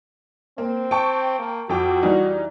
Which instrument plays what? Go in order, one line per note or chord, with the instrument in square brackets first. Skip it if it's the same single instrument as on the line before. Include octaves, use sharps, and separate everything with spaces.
[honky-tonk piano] A#3 [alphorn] C4
[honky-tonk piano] G5 A5 C#6
[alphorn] A#3
[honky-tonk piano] F2 G5 D6 [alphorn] F#4
[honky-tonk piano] E3 G3 D#4